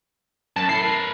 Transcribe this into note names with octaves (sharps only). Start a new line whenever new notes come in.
F#2 A5
E4 A4 C7
A#4 B4